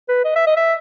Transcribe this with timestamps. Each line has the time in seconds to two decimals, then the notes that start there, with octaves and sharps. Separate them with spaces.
0.08 B4
0.24 D#5
0.36 E5
0.47 D#5
0.57 E5